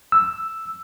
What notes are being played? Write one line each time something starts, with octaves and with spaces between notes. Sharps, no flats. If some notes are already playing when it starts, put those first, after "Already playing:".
E6